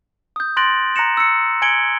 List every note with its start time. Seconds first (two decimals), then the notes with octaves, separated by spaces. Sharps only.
0.36 D#6 G6
0.57 C6 F#6 A6 A#6 D7 F#7
0.96 A#5 F#6 A#6 C#7 E7
1.17 E6 C#7
1.62 G#5 G#6 C#7 D7 F#7 G7